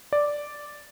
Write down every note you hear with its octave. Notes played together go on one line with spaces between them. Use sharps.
D5